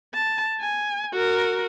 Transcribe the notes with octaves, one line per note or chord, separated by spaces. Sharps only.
A5
G#5
F#4 A#4